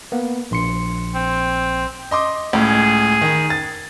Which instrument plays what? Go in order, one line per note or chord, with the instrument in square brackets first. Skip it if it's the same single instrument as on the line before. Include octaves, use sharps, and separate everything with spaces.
[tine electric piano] A#3 B3
A#1 C6 C#7
[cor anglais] C4
[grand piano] D#5 C6 D6
[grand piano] C#2 A2 [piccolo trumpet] G#4
[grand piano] D#3
A6